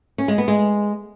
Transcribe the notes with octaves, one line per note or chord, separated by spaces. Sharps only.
C#4
G#3
B3
G#3